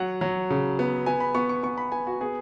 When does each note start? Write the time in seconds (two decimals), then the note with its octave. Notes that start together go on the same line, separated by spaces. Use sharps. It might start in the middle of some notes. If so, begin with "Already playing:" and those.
Already playing: F#3 F#5
0.21 F#3
0.50 C#3
0.79 B3
1.06 B3 G#5
1.20 B5
1.35 B3 C#6
1.49 C#6
1.63 B3 C#6
1.78 B5
1.92 B3 G#5
2.07 F#4
2.21 B3 G#4